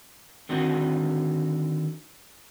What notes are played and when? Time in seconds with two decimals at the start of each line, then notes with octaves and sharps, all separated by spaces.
0.49 D3 D#3 C4 F#4